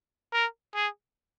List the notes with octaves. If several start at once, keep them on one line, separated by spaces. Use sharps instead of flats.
A#4
G#4